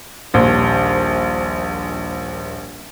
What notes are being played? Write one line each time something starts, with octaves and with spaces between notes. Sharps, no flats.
D#1 A#1 C5